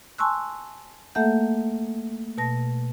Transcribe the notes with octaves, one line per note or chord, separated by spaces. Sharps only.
G#5 A5 C6 C#6 E6 F#6
A3 A#3 A4 E5 F#5 G6
B2 A5 A#6